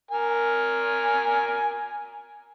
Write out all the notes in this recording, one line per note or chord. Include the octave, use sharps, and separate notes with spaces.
A#4 G#5